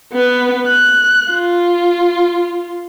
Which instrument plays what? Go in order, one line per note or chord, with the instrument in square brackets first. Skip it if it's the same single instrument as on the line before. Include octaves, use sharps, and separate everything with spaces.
[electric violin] B3 B4
F#6
F4